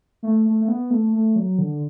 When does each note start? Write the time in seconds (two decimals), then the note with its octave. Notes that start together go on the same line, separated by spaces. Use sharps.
0.23 A3
0.45 A3
0.61 A3
0.68 B3
0.90 A3
1.13 A3
1.36 F#3
1.58 D3